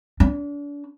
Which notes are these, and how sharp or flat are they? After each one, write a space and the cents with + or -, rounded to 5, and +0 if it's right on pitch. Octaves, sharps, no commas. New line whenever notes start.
D4 -35